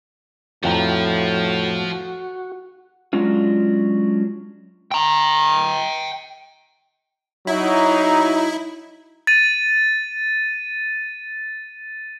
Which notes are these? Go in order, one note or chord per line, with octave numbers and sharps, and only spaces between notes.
F2 A2 F3 F#4 G5 A#5
F#3 G#3 C#4 D4 F4
G5 A#5
F#3 D#4 E4
A6 D#7